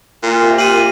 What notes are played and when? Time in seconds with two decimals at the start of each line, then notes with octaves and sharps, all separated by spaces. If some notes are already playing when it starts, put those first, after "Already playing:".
0.23 A#2
0.41 C3 G5
0.58 A#2 D#7 F#7